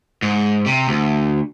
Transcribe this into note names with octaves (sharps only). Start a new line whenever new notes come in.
G#2
C3
D2